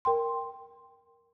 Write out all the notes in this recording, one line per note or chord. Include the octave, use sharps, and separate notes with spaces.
A#4 G5 C6